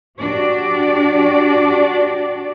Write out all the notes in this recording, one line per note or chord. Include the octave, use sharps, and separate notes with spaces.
D4 F#4 G4 D5